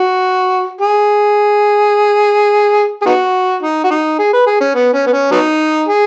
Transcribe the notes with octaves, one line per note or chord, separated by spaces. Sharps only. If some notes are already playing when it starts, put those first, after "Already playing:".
Already playing: F#4
G#4
G#4
B3 D#4 F#4
D#4
F#4
D#4
G#4
B4
G#4
C#4
B3
C#4
B3
C#4
F#3 B3 D#4
G#4